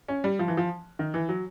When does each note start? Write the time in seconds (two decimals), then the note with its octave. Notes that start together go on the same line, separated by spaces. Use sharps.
0.08 C#4
0.24 G3
0.39 F3
0.48 E3
0.57 F3
0.99 D#3
1.14 E3
1.29 F#3